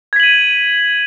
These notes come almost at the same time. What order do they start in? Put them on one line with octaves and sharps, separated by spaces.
G#6 B6 F#7 D#7